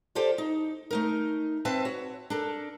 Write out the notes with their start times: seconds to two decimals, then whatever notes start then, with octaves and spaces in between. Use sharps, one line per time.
0.15 F4 G4 A4 C5 D5
0.38 D#4
0.91 A3 D#4 A#4
1.65 C4 B4 C5 E5 A5
1.85 F#4 C#5
2.30 D4 A4 A#4